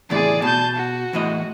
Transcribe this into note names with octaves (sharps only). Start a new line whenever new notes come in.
E2 A2 C3 G#4 D5
B2 A5 G6
F#4
E2 A2 D#5